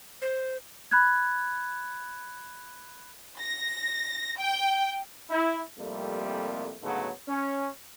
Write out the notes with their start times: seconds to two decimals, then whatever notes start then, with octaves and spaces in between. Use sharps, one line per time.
0.22 C5
0.91 B5 F#6 G#6
3.39 A#6
4.38 G5
5.29 E4
5.78 C2 F2 G3 A3 A#3
6.82 D2 G#2 C#3 F#3 A3 B3
7.28 C#4